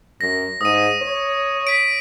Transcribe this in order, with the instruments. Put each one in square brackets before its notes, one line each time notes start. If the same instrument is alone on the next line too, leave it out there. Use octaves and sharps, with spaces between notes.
[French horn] F#2 [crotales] A#6
[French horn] G#2 [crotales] D#6 D#7
[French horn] C#5
[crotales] B6 D7